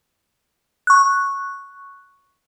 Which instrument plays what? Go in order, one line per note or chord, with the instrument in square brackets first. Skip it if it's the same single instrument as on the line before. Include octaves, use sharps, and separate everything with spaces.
[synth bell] C#6 F#6